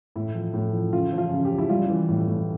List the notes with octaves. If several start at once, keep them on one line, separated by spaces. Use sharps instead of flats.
A2 E4
F3
A2
F3
C#3 F4
F3
F4
C#3
G4
F3
E4
G3 F4
E3
A2
A2